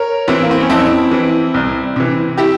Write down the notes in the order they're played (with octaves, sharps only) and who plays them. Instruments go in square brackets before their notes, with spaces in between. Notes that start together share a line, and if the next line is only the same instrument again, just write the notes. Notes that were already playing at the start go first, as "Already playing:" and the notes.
Already playing: [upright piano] A#4 C#5
E3 C4 E4
A#3
C4
C#4
F2 C4 E4
E3
C2
C3 E3
E4 G4